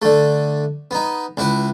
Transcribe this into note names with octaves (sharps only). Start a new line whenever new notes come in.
D3 A3
B3 D#4
C#2 E4 B4